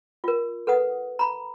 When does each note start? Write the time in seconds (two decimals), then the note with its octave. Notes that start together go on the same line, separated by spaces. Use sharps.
0.24 F4 A#4
0.67 A4 B4 F#5 D#6
1.19 A#5 B5